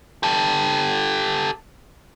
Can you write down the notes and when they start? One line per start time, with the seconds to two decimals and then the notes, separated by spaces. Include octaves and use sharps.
0.23 G4 A4